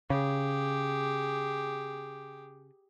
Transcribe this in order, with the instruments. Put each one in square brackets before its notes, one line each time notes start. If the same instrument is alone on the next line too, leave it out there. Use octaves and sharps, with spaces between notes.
[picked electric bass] C#3 [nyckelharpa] G4 G#4